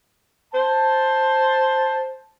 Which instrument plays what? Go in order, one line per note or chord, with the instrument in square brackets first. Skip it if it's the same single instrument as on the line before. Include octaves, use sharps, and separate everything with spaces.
[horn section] C5 A5